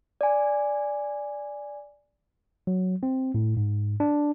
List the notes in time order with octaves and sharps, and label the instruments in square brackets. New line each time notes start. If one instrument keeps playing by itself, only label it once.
[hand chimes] D5 G#5
[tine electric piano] F#3
C4
A2
G#2
D4